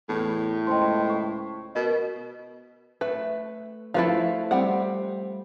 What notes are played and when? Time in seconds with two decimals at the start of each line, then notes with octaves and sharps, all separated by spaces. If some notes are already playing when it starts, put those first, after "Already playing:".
0.09 E2 A2
0.67 C#2 C5 D#5 G5 A5 C6
1.10 C#6
1.75 B2 A#4 D#5
3.01 A3 B4
3.94 F3 A3 E4 A4 B4 F5
4.51 G3 C4 F#5